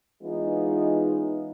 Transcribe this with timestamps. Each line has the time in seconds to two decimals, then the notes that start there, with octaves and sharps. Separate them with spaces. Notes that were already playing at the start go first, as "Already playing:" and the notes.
0.22 E3 G#3 B3 C#4 D#4 F4